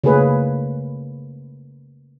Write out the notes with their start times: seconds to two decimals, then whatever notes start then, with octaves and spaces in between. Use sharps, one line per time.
0.04 C#3 A3 A#3 G#4 B4 C#5